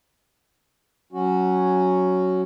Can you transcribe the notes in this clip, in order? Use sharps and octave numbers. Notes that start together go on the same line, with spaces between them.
F#3 C#4 F#4